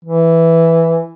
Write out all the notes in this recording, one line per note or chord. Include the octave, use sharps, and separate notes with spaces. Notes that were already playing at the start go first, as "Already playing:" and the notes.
E3